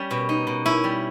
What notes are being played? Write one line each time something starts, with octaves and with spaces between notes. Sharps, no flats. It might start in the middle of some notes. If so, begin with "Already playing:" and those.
Already playing: G3 C#4
B2
D#4
B2
C#4 E4
G3